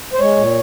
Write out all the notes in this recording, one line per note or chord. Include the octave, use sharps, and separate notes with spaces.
C5
G#3 C#5
A#2